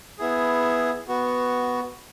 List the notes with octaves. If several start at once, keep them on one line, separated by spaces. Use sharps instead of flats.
B3 E4 G#4
B3 F#4